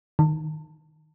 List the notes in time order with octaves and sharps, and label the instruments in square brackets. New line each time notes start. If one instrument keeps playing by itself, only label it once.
[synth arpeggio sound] D#3